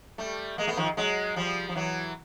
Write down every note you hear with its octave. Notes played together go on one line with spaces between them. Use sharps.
G3 A3
G#3 A#3
A3 B3
D#3 F3
F#3 G#3
F3 G3
F3
E3 F#3